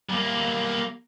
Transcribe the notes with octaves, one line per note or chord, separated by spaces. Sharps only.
G3 A#3